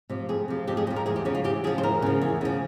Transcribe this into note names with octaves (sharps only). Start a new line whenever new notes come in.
C3 F3
F2 G#4
C3 F3
F2 G4
G#4
C3 F3 C5
A#4
E2 G#4
G4
C#3 F3 C#4
F4
E2 G4
C#3 F3 G#4
C5
E2 A#4
C#3 F3
E2
C#3 F3